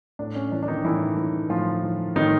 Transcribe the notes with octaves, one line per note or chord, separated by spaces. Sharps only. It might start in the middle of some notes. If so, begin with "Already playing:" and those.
A2 D4
C#4
E3 D4
D4
D#3 D#4
A2 E3 E4
E3
A2 F3 F4
E3
A2 D#3 D#4